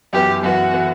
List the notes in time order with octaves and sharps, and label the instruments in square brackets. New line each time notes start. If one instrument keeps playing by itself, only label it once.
[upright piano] F#2 E3 B3 [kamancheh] G4
[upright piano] F#2 E3 B3 [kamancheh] F#4
[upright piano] E3 B3